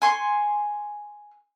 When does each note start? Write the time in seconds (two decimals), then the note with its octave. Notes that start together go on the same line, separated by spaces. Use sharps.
0.02 G#5 C6 C#6